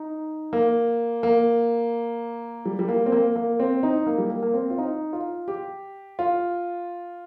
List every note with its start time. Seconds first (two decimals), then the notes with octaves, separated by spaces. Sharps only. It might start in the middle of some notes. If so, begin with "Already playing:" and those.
Already playing: D#4
0.53 A#3
1.23 A#3
2.66 G3
2.79 G3
2.88 A#3
3.06 C4
3.12 A#3
3.36 A#3
3.60 C4
3.83 D#4
4.07 A#3
4.18 G3
4.30 A#3
4.43 A#3
4.54 C4
4.70 F4
4.78 D#4
5.13 F4
5.48 G4
6.19 F4